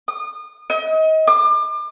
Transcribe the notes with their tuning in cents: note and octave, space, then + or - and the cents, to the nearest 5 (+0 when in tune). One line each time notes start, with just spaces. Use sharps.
D#6 -35
D#5 +30
D6 +35